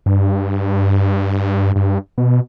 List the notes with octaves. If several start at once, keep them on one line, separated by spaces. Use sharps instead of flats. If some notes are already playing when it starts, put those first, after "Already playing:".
G2
G2
B2